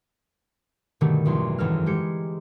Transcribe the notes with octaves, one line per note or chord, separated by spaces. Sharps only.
G2 B2 D3 D#3 A3 G4
B1 E2 B2 C6
G#1 F#2 E3 A4 A#5 F6
G#3 G4 C#7